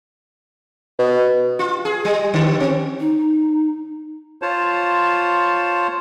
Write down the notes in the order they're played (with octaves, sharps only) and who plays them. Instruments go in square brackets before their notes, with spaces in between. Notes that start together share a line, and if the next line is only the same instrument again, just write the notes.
[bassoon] B2
[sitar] F4
G#4
G3
D3
C4
[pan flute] D#4
[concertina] F4 C5 C#5 A5